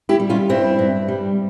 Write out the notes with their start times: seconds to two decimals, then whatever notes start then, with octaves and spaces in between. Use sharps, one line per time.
0.09 E4 G4
0.20 G3
0.29 C#4 F4
0.49 G2 C4 E4
0.79 G2
1.08 G3